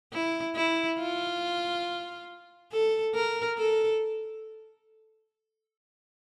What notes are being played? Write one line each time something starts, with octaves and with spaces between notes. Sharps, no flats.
E4
E4
F4
A4
A#4
A4